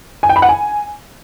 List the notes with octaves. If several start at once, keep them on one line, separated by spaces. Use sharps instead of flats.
G#5
G5
B5
F#5
G#5